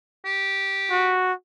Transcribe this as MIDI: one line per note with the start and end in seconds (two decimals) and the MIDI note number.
0.25 1.13 67
0.91 1.33 66